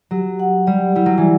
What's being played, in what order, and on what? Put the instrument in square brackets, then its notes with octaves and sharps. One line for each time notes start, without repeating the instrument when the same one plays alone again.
[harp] F#3 [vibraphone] G4
[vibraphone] F#5
[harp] G3 [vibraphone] D5
[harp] G3 [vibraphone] E4
[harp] F#3
E3